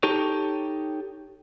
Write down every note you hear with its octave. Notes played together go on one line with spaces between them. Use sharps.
D#4 G4 A4 C#5